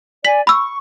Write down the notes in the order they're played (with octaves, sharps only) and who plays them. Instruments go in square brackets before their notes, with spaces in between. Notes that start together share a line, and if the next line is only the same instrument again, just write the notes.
[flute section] D5 G#5 [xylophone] B6 F#7
[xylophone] B5 E6 [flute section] C#6